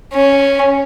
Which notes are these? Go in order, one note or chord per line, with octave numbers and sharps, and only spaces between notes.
C#4